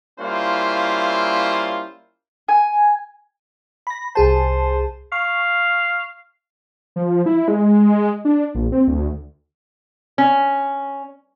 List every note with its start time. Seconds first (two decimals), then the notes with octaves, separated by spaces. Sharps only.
0.19 G3 A#3 C#4 E4 F4 C5
2.49 G#5
3.87 B5 A#6
4.15 C2 G#4 C5 A5
5.12 F5 C#6
6.96 F3
7.26 E4
7.48 G#3
8.25 D4
8.55 A#1
8.72 C4
8.88 D2
10.18 C#4